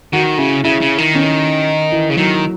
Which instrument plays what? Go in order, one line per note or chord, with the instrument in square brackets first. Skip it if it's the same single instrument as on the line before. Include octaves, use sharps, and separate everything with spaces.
[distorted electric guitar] D#3 [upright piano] F#4
[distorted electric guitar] C#3 [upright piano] E4
[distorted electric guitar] C#3 [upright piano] E4
[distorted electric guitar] C#3
D#3
[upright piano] C#4
E3
[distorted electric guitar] C#3
[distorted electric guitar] D#3 [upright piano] F#3